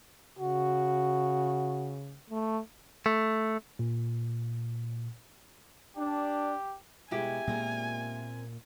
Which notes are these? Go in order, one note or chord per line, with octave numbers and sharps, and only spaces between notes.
C#3 F#4
A3
A3
A#2
D4 G4
B2 G#3 E4 G4 C#5 G#5
A#2 G#3 A#3 C4 A#4